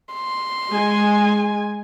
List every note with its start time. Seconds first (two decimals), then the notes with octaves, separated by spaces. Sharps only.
0.14 C6
0.70 G#3 G#5